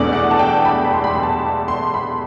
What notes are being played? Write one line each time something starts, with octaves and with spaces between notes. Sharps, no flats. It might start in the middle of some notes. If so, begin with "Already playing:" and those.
Already playing: E2 B2 A3 D4 D5
F#5
A5
G5
B5
B5
C6
B5
B5
A5
C6
B5